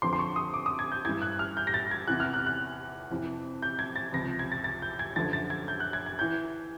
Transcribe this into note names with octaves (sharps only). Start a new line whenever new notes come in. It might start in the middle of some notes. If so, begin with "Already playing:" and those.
F2 D3 F3 C6
C6
C#6
D#6
D6
D#6
G#6
G6
G2 E3 G#6
F#6
F6
G6
A#6
A6
G#6
E2 C3 E3 F#6
F6
F#6
F#6
F2 C3 E3
G6
G#6
A6
C#2 C3 F3 A#6
G#6
A6
A6
G6
G#6
F#2 D3 F3 A6
A6
G#6
G6
F#6
G#6
G#6
E3 G6